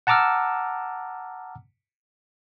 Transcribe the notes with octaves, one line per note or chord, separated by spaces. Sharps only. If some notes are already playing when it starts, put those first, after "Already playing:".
F#5 A5 A#5 D6 E6 F6